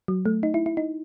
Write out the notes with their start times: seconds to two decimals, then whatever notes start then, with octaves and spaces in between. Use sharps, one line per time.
0.08 F#3
0.26 A3
0.43 D#4
0.54 E4
0.66 E4
0.77 D#4